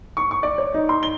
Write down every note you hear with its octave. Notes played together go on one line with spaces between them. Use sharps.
C#6
C#6
D5
C#5
D#4
C6
G7